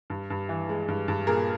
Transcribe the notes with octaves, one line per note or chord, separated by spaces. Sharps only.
G2
G2
E3
G#3
G2
G2
A#2 G#4 A#4